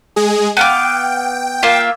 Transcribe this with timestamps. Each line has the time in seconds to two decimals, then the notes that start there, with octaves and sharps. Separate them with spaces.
0.16 G#3 G#4
0.57 B3 F5 G5 D6
1.63 A#3 F4 E5